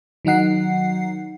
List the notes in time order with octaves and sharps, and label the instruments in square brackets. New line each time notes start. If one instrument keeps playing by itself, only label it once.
[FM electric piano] D#3 F#3 D#4 F#5 C7